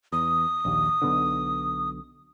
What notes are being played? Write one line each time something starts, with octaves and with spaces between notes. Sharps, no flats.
E2 D#6
A#1 D#2
B1 B2 D3